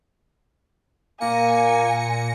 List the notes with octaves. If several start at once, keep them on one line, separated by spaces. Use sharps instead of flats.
A#2 A#3 G#5 A#6 C#7